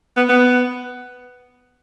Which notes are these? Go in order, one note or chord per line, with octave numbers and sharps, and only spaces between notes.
B3
B3